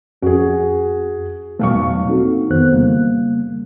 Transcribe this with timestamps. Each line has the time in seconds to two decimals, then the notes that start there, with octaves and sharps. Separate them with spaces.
0.22 F2 C#4 F#4 G#4
1.59 B1 E2 G3 A3 F5 C#6
2.07 A#3 C4 D#4 F#4 A4
2.50 F2 D#3 B3 C5 F#6
2.73 C#3 G3 A#3